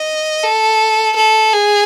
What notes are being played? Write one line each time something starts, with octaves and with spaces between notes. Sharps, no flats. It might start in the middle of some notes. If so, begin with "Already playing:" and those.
Already playing: D#5
A4
A4
G#4